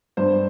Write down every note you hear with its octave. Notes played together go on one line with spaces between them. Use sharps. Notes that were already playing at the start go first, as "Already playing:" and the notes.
G2 C5